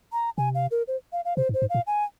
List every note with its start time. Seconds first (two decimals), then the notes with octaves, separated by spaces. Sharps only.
0.12 A#5
0.38 C3 G#5
0.55 F5
0.71 A#4
0.88 C5
1.13 F5
1.25 F5
1.37 C3 C5
1.49 G#2
1.54 C5
1.62 G#2
1.70 A#2 F5
1.87 G#5